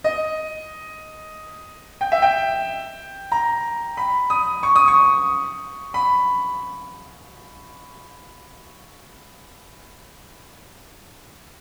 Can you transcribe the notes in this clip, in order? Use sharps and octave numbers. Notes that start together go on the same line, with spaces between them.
D#5
G5
E5
G5
A#5
B5
D#6
C#6
D#6
C#6
B5